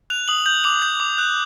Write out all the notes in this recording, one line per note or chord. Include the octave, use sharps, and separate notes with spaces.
F#6 F7
D#6 F#7
G6 F#7
D6 F7
G6
D6
F#6